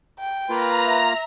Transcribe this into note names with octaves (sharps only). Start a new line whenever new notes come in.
G5
A#3 F4 B4 A#5
E5